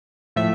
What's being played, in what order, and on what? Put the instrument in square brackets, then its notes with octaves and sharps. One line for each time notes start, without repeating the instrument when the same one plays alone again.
[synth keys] A2 F3 A3 E5